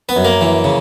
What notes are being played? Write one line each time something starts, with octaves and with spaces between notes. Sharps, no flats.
B3 B4
F#2
A#3 A#4
E3
C#3